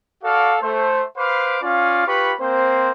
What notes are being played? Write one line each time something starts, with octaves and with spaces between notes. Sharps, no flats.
F#4 A4 D5 F5
A3 C5
B4 C5 F5 B5 D6
C#4 F4 D5 F5
F4 G4 B4 B5 C#6
A#3 C4 C5